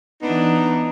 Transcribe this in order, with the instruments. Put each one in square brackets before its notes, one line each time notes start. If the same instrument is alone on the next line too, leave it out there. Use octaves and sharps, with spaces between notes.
[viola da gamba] E3 D4 [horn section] B3 D#4